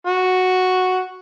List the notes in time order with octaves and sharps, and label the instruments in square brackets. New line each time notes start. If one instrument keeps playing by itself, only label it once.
[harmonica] F#4